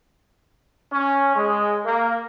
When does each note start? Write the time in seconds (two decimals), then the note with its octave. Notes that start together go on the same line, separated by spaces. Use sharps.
0.93 C#4
1.36 G#3
1.86 A#3